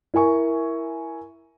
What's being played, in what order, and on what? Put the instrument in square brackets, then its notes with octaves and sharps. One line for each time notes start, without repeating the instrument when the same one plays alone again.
[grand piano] E4 A#4 G#5 C#6